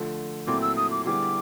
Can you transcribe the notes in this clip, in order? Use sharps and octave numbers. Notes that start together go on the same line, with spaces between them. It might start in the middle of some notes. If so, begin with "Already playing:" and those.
Already playing: D3 F3 A3
A#2 F#3 A3 C4 E4 D6
E6
D#6
D6
D3 G3 B3 E4 G#4 D6